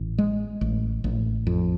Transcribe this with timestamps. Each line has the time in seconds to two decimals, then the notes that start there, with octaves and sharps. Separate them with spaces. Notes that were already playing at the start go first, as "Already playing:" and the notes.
Already playing: A1
0.18 G#3
0.61 A1
1.04 A1
1.47 F2